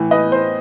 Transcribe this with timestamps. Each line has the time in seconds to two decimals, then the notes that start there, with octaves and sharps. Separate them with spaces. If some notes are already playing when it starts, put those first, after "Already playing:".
Already playing: A2 E3
0.11 B4 D#5
0.32 C5